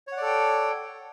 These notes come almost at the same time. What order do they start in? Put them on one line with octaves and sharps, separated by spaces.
C#5 F#5 D5 A4 G5